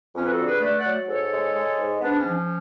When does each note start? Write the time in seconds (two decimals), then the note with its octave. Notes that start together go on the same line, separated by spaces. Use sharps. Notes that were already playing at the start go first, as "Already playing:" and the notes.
0.14 F2 C#4
0.24 B4
0.30 F#4 A4
0.38 D3
0.46 G#4 B4
0.61 A3 B4 D5
0.76 D5 F#5
0.85 F#3
1.08 G#2 A4 C#5
1.31 G#3
1.54 G#3
1.78 G#2
2.01 G#2 B3 D4
2.17 C#4
2.24 F3
2.32 C#4